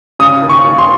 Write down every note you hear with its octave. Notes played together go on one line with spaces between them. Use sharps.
C#3 D#6
D#2
C#6
D#2
C6